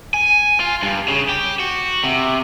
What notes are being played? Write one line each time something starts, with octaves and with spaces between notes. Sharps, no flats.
G#5
F4
G2
C#3
G4
F#4
C3